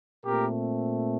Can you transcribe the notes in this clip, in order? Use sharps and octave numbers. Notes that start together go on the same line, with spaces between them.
A#2 A3 C4 G4 A#4